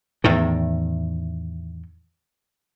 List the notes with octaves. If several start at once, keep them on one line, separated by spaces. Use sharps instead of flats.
E2 A2 D#3